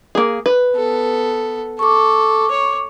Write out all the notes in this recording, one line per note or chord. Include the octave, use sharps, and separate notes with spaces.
A#3 G#4
B4
B3 A4
A4 C#6 D6
C#5